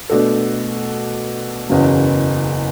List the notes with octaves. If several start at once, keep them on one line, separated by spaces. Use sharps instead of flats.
B2 A3 D4 F#4 A4
F#1 E2 C#3 F#3